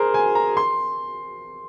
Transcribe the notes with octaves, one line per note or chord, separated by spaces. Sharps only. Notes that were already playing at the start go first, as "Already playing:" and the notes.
Already playing: G#4 A#4 C5
G#5
A#5
C6